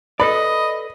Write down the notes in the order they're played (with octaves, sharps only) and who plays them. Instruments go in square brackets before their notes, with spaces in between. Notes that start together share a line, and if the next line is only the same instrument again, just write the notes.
[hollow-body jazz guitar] A4 B4 D5 [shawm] D#5 [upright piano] B5